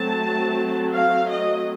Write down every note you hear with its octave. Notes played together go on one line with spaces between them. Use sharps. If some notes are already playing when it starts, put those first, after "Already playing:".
Already playing: F#3 A3 C4 A5
F5
D#5